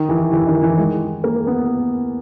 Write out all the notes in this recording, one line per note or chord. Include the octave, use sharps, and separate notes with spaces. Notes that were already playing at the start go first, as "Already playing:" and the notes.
Already playing: D#3
E3
E3
D#3
E3
G#3
A#3
B3